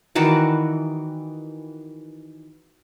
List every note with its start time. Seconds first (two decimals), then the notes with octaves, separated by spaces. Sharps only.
0.15 D#3 E3 F#4 D5